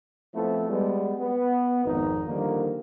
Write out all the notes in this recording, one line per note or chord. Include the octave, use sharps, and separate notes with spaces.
F3 A3 B3 C4 E4 A4
G3 G#3 B3
B3
G#1 F2 D#4
D3 D#3 F3 G3 A#3